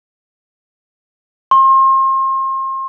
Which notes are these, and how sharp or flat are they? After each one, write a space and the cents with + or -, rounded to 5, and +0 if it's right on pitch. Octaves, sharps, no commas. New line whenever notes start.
C6 +35